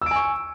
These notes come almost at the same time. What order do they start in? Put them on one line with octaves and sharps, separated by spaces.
E6 D7 G#5 C#6